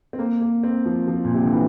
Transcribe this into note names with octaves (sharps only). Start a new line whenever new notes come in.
C4
A#3
A#3
C4
F3
F3
A#2
C3
D3
E3